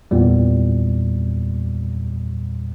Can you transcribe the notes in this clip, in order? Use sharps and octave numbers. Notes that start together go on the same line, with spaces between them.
E2 A#2 G3